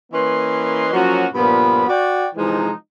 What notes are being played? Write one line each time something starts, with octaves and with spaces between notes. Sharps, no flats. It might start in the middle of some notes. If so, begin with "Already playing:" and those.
E3 A#3 C#4 B4 D#5 C6
F3 F#3 A#3 C#4 F#4
G2 A#2 F3 B3 B5
F#4 D5 G5
C3 E3 F3 G#3 D#4